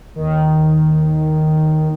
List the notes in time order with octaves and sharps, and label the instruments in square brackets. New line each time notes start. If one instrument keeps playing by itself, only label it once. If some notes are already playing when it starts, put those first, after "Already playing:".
[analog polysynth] D#2 D#3